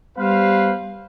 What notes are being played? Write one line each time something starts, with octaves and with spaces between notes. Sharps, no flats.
G3 B3 B4 C5 F5